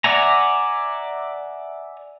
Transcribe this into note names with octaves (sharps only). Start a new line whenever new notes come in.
D5 E5 F#5 G#5 A#5